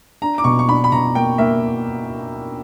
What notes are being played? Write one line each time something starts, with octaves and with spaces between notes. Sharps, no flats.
D4 A#5
D6
B2 C#6
C#6
D4 B5
B5
B2 A#5
A#3 G5
A#3 E5